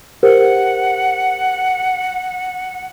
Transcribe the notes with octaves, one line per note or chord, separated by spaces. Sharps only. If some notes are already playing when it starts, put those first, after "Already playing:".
G4 A#4 C5 F#5